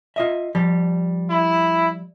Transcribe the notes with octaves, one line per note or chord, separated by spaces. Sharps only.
F4 D#5 E5
F3 G3
E4